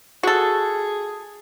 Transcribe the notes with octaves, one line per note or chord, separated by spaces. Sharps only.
F#4 G#4 A4